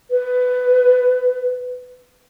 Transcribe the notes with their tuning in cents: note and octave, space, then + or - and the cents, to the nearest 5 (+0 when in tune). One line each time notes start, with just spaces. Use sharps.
B4 +15